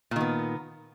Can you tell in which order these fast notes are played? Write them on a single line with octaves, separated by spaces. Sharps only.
A#2 D#3 B3